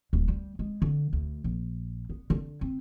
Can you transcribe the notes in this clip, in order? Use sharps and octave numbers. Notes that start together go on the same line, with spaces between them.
D1
G3
G#3
D3
D2
A#1
B3
D3
C4